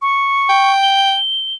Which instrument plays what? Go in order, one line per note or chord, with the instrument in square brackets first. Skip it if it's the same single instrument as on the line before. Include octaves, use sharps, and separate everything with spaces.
[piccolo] C#6
[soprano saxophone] G5
[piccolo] G7